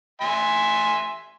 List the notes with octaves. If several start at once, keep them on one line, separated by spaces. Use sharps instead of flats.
E5 G#5 C6